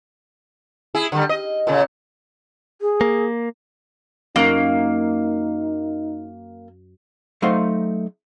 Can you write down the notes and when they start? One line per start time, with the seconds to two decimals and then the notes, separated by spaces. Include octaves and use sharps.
0.95 E4 G#4
1.12 D3 G3
1.29 D#5
1.67 A#2 C#3
2.81 G#4
3.01 A#3
4.36 F#2 A#3 D#4 F#5 A#5
7.42 F#3 A3 D#4 C5 F5 C6